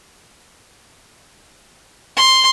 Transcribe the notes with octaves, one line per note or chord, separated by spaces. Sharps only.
C6